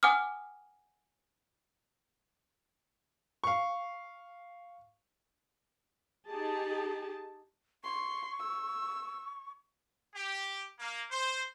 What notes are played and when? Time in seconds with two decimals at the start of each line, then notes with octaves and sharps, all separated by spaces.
0.03 F#5 G#5 D6 D#6 F6
3.44 F5 C#6
6.27 D#4 G4 G#4 A5
7.84 C6 C#6
8.40 E6
10.13 G4
10.79 A#3
11.11 C5